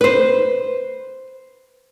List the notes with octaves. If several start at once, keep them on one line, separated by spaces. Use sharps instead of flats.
B4 C5